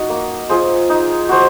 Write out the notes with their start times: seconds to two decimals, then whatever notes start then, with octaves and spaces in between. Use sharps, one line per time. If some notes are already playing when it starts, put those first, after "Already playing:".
Already playing: D#4 F#4
0.09 A#3
0.49 F4 G#4 C5
0.90 D#4
1.29 F#4 C5